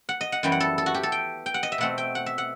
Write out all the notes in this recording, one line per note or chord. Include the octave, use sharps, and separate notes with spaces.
F#5
D#5
F#5
F#2 E3 G3 B3 G5
F#5
A4
A4
F#4
G4
A4
G5
G5
F#5
D#5
E5
B2 A3 C4 F#5
G5
F#5
E5
F#5